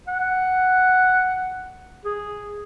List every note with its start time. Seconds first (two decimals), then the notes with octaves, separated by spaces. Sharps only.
0.08 F#5
2.05 G#4